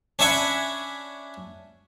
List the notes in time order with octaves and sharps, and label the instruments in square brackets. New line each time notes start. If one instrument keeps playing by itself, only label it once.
[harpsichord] C#4 D4 E5 F#5 G#5 B5